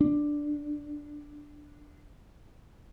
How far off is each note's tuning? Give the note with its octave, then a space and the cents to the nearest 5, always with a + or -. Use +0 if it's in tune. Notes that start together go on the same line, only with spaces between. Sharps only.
D4 +5